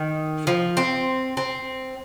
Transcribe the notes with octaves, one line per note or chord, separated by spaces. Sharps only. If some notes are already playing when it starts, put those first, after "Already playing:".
Already playing: D#3
F3
C4
C4